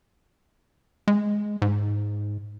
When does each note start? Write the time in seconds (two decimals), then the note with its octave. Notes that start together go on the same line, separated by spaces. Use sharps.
1.08 G#3
1.62 G#2